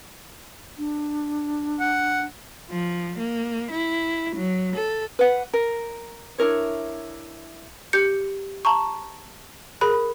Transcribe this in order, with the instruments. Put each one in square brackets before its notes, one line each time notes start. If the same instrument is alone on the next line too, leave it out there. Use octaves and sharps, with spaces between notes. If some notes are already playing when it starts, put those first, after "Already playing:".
[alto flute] D4
[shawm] F#5
[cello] F3
A#3
E4
F#3
A4
[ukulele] B4 F#5
A#4
D4 E4 A#4 C#5
[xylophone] G4 G6 C#7
A5 A#5 C#6
G#4 A#4 B5 F#6